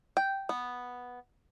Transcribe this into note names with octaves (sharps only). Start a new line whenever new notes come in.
G5
B3